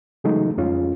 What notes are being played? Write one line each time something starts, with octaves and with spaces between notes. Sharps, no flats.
C#3 E3 F#3 G#3 A3 D#4
F2 G#3 C#4 F4